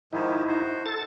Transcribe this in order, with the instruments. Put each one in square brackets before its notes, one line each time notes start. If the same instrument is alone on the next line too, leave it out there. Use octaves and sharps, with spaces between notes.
[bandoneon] G#2 D#3 F3 [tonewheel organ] D#4 E4
[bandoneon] F#4 C5
[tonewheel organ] A4 A6